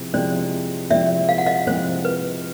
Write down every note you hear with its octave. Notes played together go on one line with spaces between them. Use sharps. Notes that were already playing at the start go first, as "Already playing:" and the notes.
Already playing: C3 F3 G#3 C4 E4
C3 F3 G#3 C4 E4 C5 D5
C3 F3 G#3 C4 E4 D5 E5
F5
F#5
D#5 F5
C3 F3 G#3 C4 E4 C5
B4